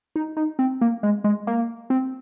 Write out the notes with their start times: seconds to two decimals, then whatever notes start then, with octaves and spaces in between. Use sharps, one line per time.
0.16 D#4
0.37 D#4
0.59 C4
0.81 A#3
1.03 G#3
1.24 G#3
1.47 A#3
1.90 C4